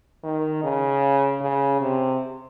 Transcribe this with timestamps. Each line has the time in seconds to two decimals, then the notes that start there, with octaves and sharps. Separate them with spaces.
0.24 D#3
0.63 C#3
1.41 C#3
1.81 C3